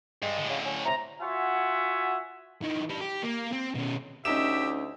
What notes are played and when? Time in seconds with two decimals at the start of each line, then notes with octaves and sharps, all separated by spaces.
0.22 G2 G#3
0.38 A2 D3
0.50 C#3
0.66 C#4
0.85 C3 A#5
1.21 F4 F#4 C#5 E5 F#5 G#5
2.62 E3 D#4
2.90 G4 B4
3.01 G4
3.23 A#3
3.53 C4
3.75 B2 C#4
4.25 D2 C#4 D#4 G4 E5 E7